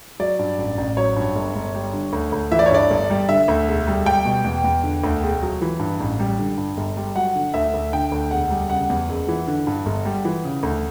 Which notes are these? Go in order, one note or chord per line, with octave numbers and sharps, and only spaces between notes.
F#3 D5
G2
A1
A1
F#3 C#5
G2
G1
G1
G3
D3
D2
D2
E3 E5
D5
C#5
G2 D5
G1
G3
D3 E5
D2
E1
G3
G3 G5
B2
E2
E2
D3
D2
E1
F#3
E3
G2
A1
G3
D3
G2
G1
G3
F#3 F#5
D3
D2 E5
D2
D3 G5
D2
E1 F#5
G3
C#3 F#5
E2
F#1
E3
D3
G2
G1
G3
E3
C#3
D2